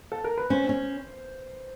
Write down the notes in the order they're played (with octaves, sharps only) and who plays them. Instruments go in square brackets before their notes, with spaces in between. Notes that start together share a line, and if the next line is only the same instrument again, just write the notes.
[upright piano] A4
A#4
B4
[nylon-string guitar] C#4 [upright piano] C5
[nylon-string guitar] C#4